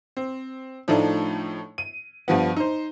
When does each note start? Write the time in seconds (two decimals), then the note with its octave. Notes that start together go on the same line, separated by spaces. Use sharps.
0.17 C4
0.88 A2 F3 A3 D4 D#4
1.78 D#7
2.28 G2 F3 B3
2.57 D#4 C5